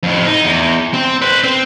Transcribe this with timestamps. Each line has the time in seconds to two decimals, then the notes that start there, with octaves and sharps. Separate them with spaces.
0.03 F2 A2
0.26 D#4
0.44 E2
0.94 C4
1.22 B4 C5
1.44 C4